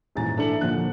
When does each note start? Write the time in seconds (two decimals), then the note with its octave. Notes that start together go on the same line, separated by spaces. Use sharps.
0.16 D#1 G#2 E3 G#5 A#5 A6
0.37 A2 D4 A4 E5 C#7 F#7
0.61 D#1 D3 F3 A#3 F#6